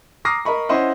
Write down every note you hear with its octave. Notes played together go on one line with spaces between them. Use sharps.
A#5 D6 D#6 F6 A#6 C7
A#4 D#5 B5 C#6
C#4 E4 C5 D#5 F#5